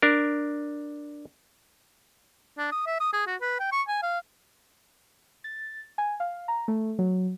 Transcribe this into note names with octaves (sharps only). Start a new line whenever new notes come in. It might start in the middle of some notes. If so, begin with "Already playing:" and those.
D4 A#4
D4
D#6
E5
D#6
G#4
F#4
B4
G5
C#6
G#5
F5
A6
G#5
F5
A#5
A3
F#3